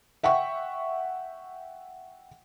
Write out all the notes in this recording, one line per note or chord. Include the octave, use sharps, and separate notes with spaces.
E5 F#5 G5 C#6